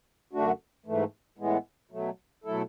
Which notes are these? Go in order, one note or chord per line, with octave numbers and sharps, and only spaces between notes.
F#2 D3 A3 D4 F#4
G#2 E3 A3
A2 E3 G#3 B3
B2 F#3 A3
B2 F#3 A3 E4 A4